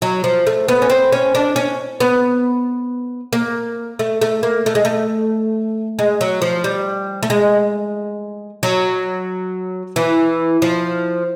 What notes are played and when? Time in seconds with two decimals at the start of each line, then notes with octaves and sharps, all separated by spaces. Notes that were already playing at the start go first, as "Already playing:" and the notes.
0.02 F#3
0.24 F3
0.47 A3
0.68 B3
0.82 C#4
0.90 C4
1.12 C#4
1.35 D4
1.56 C#4
2.00 B3
3.33 A#3
3.99 A3
4.22 A3
4.43 A#3
4.66 A3
4.75 G#3
4.85 A3
5.99 G#3
6.21 F#3
6.42 F3
6.64 G3
7.23 A3
7.30 G#3
8.63 F#3
9.96 E3
10.62 F3